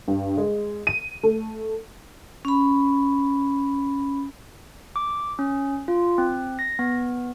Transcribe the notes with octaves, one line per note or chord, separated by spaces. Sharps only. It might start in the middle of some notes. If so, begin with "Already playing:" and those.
G2
G#3
D#7
A3
C#4 B5
D6
C#4
F4
C4
A#6
B3